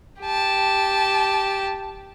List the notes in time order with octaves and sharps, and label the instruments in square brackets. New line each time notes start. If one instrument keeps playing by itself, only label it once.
[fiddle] G4 A5